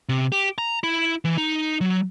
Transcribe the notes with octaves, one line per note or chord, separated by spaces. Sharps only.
C3
G4
A#5
E4
E3
D#4
F#3